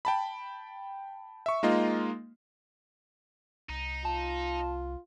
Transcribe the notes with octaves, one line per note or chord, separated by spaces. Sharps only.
G5 A5 B5
E5 C#6
G#3 A#3 D#4 F4 D#5
C2 D#4
F4 A5